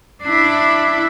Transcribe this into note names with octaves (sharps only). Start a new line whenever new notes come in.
D4 E4